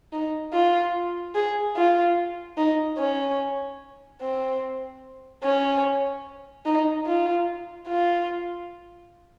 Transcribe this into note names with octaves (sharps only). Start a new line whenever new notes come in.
D#4
F4
G#4
F4
D#4
C#4
C4
C#4
D#4
F4
F4